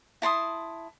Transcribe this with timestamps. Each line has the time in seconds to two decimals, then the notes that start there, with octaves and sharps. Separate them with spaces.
0.22 E4 A5 C6 D#6